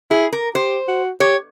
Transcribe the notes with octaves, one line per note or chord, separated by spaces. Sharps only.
E4 G#4
A#4
G4 C5
F#4
G4 C#5